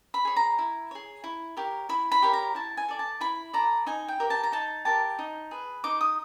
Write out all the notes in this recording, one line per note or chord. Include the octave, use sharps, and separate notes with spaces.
B5
G#4 C#5
A#5
E4
G#4 C#5
E4
G4 A#4 C#5
E4 B5
B5
G4 A#4 C#5
A#5
E4 A5
G#5
A4 D5
A5
E4 B5
A4 D5 A#5
D#4 G#5
G5
G4 A#4
A5
A#5
D#4 A5
G4 A#4 A5
D#4
G#4 B4
D#4 D6
D#6